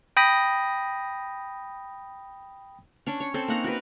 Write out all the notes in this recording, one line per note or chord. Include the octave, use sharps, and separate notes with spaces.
G5 B5 D#6 A#6
C#4 D4
C#5
C4 C#4 A4 C5
A#3 D#4 F#5 A#5
F#4 A#4 B4